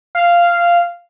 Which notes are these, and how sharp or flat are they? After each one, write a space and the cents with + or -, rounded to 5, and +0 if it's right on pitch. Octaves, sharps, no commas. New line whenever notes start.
F5 -10